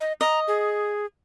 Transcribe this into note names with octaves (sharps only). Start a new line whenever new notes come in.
D#5
D#5 A#5
G#4